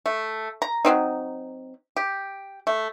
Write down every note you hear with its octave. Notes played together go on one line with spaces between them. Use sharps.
A3
A#5
F#3 B3 C4 D#4
G4
A3